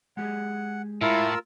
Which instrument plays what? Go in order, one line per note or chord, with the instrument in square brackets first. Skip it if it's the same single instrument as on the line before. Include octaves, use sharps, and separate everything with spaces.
[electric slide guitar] G#3 G4 G#4 [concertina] F#5
[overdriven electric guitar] A2 [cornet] E4 [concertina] F4 A#4 E6